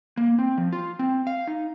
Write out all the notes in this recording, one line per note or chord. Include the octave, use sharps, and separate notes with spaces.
A#3
C4
F3
F4
C4
F5
D#4